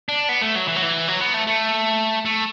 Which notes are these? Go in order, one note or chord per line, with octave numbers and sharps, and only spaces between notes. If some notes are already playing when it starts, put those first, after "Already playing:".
D4
B3
A3
F#3
E3
F#3
E3
F#3
B3
A3
A3
A3